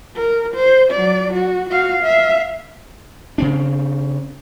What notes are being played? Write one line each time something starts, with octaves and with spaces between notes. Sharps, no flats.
A#4
C5
F#3 D5
F#4
F#4 F5
E5 F5
C#3 C4 D4